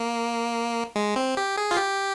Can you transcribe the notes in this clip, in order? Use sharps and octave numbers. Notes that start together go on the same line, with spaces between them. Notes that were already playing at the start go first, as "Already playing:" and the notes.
Already playing: A#3
G#3
C4
G4
G#4
F4
G4